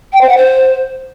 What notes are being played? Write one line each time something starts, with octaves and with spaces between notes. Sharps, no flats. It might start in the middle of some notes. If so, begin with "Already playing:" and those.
G5
C5
F#5
C5